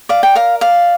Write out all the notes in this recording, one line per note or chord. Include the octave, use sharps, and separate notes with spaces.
D5 F5
G5
A#4 F5
D5 F5